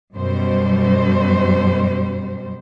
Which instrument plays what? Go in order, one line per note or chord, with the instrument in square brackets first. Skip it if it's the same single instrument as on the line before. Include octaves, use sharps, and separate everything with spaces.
[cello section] F#2 B2 G3 C5